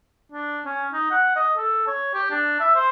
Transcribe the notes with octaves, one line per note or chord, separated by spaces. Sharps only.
D4
C#4
D#4
F#5
D#5
A4
C#5
G4
D4
E5
C5